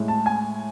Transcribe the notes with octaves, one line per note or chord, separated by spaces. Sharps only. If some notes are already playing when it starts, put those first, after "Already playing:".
Already playing: A2 G#3
A5
G#5